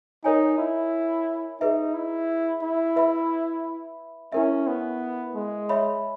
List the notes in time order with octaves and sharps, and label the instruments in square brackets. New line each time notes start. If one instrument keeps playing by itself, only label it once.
[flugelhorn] D#4 [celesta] A#4 C#5 G#5
[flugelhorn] E4
[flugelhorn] D#4 [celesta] G#4 B4 E5
[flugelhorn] E4
E4
[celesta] B4 E5 B5
[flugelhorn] C#4 [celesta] E4 A#4 E5
[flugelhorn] B3
G#3
[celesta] C#5 E5 B5